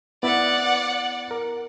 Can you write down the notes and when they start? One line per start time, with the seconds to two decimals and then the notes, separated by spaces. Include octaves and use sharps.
0.23 B3 E4 D5 F#5 B5
1.31 A#4